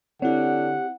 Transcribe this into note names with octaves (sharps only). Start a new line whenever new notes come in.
D3 C4 E4 G4 C#5 F#5